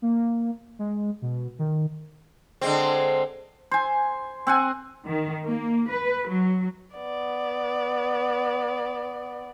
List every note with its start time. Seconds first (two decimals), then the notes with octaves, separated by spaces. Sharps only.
0.02 A#3
0.79 G#3
1.22 B2
1.59 D#3
2.61 D3 G#3 C4
3.71 C5 G#5
4.47 C4 F#5 G#5
5.06 D#3
5.45 A#3
5.91 B4
6.29 F#3
6.96 B3 D5